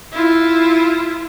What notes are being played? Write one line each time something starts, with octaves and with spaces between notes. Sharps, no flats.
E4 F4